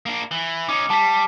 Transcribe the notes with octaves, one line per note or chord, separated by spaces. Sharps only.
A#3 D4
E3
C#4 D#4 D6
G3 A5 B6